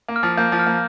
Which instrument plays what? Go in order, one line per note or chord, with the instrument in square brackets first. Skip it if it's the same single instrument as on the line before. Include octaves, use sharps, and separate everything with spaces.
[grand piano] A#3
[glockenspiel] F6
[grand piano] F3
[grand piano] A#3 [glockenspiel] G6
[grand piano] F3
[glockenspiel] F6
[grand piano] A#3